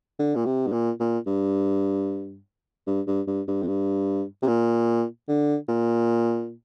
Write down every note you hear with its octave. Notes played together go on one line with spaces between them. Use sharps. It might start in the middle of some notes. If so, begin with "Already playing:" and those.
D3
A#2
C3
G2
A#2
A#2
G2
G2
G2
G2
G2
F2
G2
C3
A#2
D3
A#2